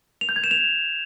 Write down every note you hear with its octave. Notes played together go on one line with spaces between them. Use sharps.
F7
G6
G#6
E7
F7